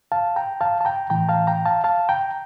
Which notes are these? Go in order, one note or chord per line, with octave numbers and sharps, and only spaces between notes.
F5 A5
G5 A#5
F5 A5
A5
G5 A#5
A2 E3 G5 A#5
F5 A5
G5 A#5
F5 A5
F5 A5
G5 A#5